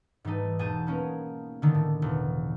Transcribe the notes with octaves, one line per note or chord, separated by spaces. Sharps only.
G#2 E3 G3 A3 D#4
E1 G#4 A5 G6 D#7
A#3 B3 C#4 D#4 A#4
D3 D#3 A3
A2
E1